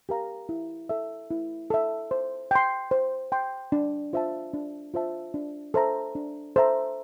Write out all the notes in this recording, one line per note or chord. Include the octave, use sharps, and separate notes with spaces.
G4 A#4 F5 A#5
E4
A4 E5
E4
A4 E5
C5
G5 C6
C5
G5 C6
D4
F4 C5 E5 A5
D4
F4 C5 E5 A5
D4
A4 C5 E5 A#5
D4
A4 C5 E5 A#5